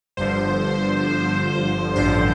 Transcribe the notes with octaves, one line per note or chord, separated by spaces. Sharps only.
G1 G2 D3 F3 C5
A1 G2 D3 F3 C5